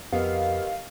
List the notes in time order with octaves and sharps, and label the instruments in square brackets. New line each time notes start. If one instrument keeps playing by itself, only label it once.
[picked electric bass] F2 [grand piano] B3 [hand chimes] G4 A#4 D#5 [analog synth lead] F5